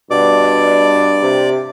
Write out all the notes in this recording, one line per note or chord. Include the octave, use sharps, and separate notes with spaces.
G2 B2 D4 D5 D6
C3